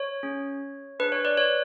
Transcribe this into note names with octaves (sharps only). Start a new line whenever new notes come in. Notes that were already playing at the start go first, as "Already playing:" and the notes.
Already playing: C#5
C#4 G#4
D4 G#4 B4
C#5
B4 D5
C#5